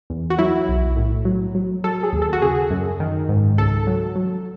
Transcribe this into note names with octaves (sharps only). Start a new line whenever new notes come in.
E2
F#4
F#3 E4
B1
A2
F#3
F#3
F#3 A4
G#4
D#2
A4
F#4
C#3 G#4
F#2
D#3
G#2
C#2 A4
F#3
F#3